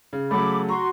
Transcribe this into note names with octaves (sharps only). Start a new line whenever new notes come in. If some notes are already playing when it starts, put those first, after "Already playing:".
C#3
C#3 F#3 A3 B5 D6
F#4 A#5 C6 C#6